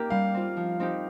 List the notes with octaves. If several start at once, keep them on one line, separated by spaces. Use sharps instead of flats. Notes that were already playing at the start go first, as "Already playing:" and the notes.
Already playing: A#3 D#4 G4 A#4
G3 F5
C4 F4
F3
C4 D#4 G4